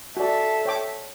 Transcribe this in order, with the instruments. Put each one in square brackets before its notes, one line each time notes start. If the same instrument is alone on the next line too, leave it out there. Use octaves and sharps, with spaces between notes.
[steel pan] F#4 D5 [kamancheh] A4 E5
[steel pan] C#5 G5 D6